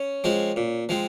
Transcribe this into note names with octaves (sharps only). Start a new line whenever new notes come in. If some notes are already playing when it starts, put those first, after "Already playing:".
Already playing: C#4
F3 G#3 C4
A#2
F3 G#3 C4